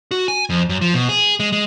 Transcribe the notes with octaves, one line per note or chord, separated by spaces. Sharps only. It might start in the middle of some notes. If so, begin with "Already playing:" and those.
F#4
G#5
F2
F#2
F3
B2
G#4
G#3
G#3